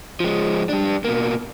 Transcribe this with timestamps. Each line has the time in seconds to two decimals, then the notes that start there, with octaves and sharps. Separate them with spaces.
0.20 F3 G#3
0.69 G3 D4
1.04 B2 A#3